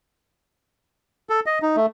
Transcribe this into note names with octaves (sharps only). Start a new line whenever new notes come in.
A4
D#5
D#4
A3